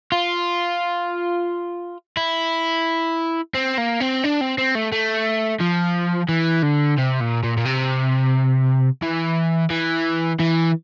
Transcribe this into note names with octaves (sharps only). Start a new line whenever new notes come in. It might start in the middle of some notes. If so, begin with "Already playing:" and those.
F4
E4
C4
A#3
C4
D4
C4
C4
A3
A3
F3
E3
D3
C3
A#2
A#2
A#2
C3
E3
E3
E3